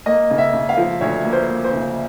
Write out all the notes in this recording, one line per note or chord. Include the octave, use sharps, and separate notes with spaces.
A#3 D#5
C#3
E5
C#3
F5
F3
D2 C#5
A#3
C5
A#3
C5
C#3